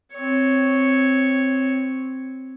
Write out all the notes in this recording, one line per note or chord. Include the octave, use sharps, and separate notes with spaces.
C4 C#5